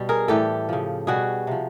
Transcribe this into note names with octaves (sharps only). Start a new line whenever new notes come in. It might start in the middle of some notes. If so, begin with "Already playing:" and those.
Already playing: B2 G3
G#4 A#4
A2 E3 G3 G4 A4
C#3 F3
B2 G3 F#4 G#4
C3 F3